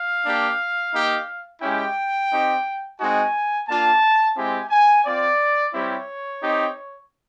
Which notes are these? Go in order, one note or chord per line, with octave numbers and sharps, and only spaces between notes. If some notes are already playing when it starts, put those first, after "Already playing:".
Already playing: F5
A#3 D4 G4
A#3 D#4 G4
G#3 C#4 E4 G4 G5
C4 D#4 G4
G#3 C4 D#4 F#4 G#5
A#3 D4 F4 A5
G#3 C4 E4 G4 G#5
G#5
C4 F4 D5
G3 C4 E4 G4 C#5
C4 D#4 G4